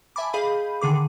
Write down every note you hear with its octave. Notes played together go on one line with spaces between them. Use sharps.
E5 G#5 A5 B5 D6
G#4 D#5 F5 B5 G6 D#7
D3 D#3 G#4 D6